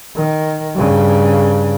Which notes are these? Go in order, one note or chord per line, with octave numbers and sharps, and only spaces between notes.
D#3
G2 C#3